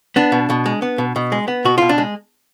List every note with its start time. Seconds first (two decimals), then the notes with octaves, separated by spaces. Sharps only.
0.16 B3 D4
0.32 B2
0.50 B2
0.66 G#3
0.82 B3
0.98 B2
1.16 B2
1.32 G#3
1.48 B3
1.65 B2 F#4
1.78 B2 F4
1.89 D4
1.98 G#3